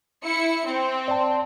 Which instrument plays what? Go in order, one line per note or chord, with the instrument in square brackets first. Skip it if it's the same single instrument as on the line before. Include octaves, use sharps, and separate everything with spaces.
[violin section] E4 C#7
C4
[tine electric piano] D5 A5